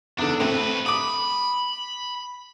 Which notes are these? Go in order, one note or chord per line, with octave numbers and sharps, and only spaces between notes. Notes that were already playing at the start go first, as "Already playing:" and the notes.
E2 D3 D4
A2 A3 C4 B4
B5 D6 D#6